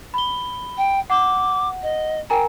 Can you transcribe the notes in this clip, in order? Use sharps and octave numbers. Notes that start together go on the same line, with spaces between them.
B5 G7
G5
F#5 D6
D#5
A#4 G5 G#5 A#5